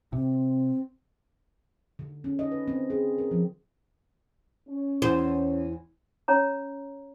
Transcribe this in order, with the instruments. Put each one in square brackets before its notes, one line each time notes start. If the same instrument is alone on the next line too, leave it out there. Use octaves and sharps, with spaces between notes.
[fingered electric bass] C3 [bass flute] C4
[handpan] D3
C#4
D#5
B4
C4
G#4
A#4
F3
[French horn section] C#4
[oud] E2 C5
[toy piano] C#4 C#5 A#5